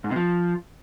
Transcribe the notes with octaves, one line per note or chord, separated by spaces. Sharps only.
G#2
C3
F3